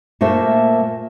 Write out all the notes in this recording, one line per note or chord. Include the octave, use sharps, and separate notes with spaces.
A#2 A3 A#3 C5 E5